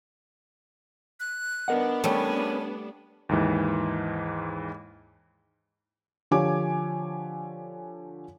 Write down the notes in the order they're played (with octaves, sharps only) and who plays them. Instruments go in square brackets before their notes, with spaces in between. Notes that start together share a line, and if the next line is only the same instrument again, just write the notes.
[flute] F#6
[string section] B3 D4 [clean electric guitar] A#4 D#5 F#5
[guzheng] G3 A3 [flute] C#4
[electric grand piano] D#2 G#2 E3
[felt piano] D3 F3 G4 C#5 G#5 D6